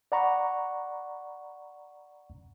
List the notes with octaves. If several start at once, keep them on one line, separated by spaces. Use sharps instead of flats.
D5 F#5 A#5 B5 C#6